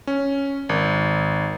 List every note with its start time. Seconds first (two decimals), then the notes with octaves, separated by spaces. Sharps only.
0.07 C#4
0.69 G#1